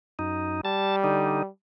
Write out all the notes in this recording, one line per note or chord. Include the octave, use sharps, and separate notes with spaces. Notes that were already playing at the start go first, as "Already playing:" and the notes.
F#2 D#4
G3 A5
D3 D#4